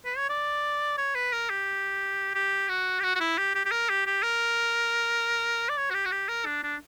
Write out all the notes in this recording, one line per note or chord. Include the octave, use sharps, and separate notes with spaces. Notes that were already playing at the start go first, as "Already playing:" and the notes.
B4
C#5
D5
C#5
B4
A#4
G4
G4
F#4
G4
F#4
F#4
E4
G4
G4
G4
A#4
G4
G4
A#4
D5
C#5
F#4
G4
F#4
G4
A#4
D4
D4